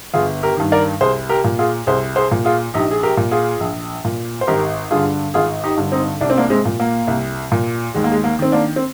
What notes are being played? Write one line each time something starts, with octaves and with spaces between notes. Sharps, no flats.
G1 F4 G#4
G4 A#4
G2 D#3
A#4 D5
C2 G#4 C5
G4 A#4
A#2
F4 G#4
C2 G#4 C5
G#4 C5
A#2
F4 G#4
A#1 D#4 G4
G#4
G4 A#4
A#2
F4 G#4
A#1
A#2
C5
G#1 G4 A#4
G2 D3 F4 G#4
G#1 F4 G#4
D#4 G4
G2 D3
C4 D#4
C2 D4
C4
A#3 D4
G#3 C4
A#2
A#3
C2
A#2
D#2 G#3
A#3
G#3
A#3
D#3 C4
A#3 D4
C4